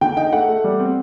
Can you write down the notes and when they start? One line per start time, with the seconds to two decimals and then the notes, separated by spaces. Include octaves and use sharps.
0.01 D3 G5
0.17 D#4 G5
0.33 A3 F#5
0.48 A3
0.64 G3
0.80 C4